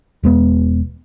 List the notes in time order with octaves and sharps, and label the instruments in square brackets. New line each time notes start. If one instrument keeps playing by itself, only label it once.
[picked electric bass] E1 G#3 B3